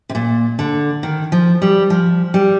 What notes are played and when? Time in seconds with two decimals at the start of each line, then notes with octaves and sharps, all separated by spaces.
0.09 C3
0.15 A#2
0.59 D3
1.03 D#3
1.32 F3
1.62 G3
1.90 F3
2.34 G3